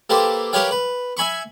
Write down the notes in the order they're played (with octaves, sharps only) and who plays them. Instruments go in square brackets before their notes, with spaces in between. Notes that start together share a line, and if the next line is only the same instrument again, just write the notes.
[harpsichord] A#3 G4 A4 B4 C5
G4 A#4 B4 C#5 F5 G5
B4
E5 G#5 B5 C#6